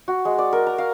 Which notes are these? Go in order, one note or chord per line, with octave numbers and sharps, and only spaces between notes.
F#4
G#3
D5
A#4
A#5
F5